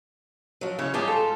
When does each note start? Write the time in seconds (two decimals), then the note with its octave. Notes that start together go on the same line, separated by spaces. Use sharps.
0.61 F3 F#3
0.79 C#3 E4 C#5
0.94 G#2 G3 F4 G#4 A5
1.08 A4